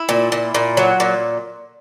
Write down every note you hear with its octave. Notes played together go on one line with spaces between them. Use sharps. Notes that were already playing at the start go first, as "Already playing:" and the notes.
Already playing: E4
A#2
A#2
A#2
F#3
A#2